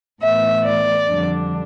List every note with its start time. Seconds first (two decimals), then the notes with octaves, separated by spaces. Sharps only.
0.22 A2 E3 B3 E5
0.64 D5
1.08 F2 D3 G3 D4